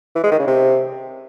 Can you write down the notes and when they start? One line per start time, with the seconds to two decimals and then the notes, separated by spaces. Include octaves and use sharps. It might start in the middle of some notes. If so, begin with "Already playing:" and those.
0.16 E3
0.24 G#3
0.31 D#3
0.39 C#3
0.47 C3